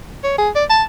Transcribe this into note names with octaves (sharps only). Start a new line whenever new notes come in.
C#5
G#4
D5
A5